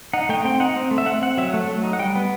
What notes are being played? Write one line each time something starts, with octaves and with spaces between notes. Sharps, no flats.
D#4 F#5
A3 G5
C4 G5
D#4 F#5
C4
A3
E5
C4 F#5
C4 F#5
F#3 E5
A3 F#5
F#3
D#4
F#5
G3 G5
B3